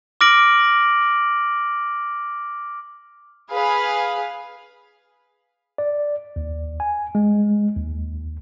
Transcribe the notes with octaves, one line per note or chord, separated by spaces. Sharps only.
D6 F6 A#6 D7 F#7
G#4 B4 F5
D5
D#2
G#5
G#3
D#2